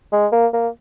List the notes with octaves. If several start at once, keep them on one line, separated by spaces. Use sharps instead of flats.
G#3
A#3
A#3